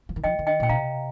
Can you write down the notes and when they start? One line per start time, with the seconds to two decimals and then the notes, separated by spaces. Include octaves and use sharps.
0.09 F3
0.16 D#3
0.24 F3 D#5 G5
0.39 D#3
0.47 D#5 G5
0.60 A#2 G5
0.69 C3 F5 A#5